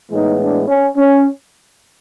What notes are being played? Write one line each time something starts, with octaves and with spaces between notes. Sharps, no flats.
A2 E3 G#3 B3 D#4
D4
C#4
C#4